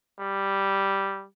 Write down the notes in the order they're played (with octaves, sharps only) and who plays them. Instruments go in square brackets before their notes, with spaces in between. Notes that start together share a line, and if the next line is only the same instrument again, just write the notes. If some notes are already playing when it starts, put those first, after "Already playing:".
[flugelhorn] G3